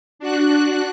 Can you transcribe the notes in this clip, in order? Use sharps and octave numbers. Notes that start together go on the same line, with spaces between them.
D4 F#4 F#6